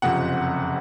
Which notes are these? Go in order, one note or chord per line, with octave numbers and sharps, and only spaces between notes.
F#1 F2 C3 F#5